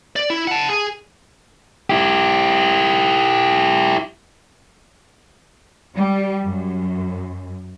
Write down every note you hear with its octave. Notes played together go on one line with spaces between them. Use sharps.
D5
E4
F#5 A5
G#4
E4 G4
G3
F#2